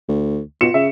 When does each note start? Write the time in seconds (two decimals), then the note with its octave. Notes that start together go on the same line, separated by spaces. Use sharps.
0.08 D2
0.61 B2 F4 C#7 E7
0.74 C#3 E5